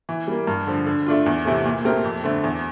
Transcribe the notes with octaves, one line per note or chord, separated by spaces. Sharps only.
E3
G3 A#3
G2
D3 F3
D3
A3 D4 F4
E2
C3 E3 A3
A#2
A3 C4 G4 A#4
F2
D3 A3 C4
E2